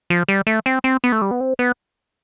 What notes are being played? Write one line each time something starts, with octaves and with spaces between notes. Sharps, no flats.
F3
G3
A3
C4
C4
B3
A3
G3
B3
C4
B3